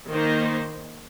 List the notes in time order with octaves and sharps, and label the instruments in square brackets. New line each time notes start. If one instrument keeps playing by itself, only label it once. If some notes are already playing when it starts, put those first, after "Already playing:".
[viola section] D#3 A#3 D#4 C5